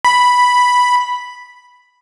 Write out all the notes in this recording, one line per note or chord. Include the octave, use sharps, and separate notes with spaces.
B5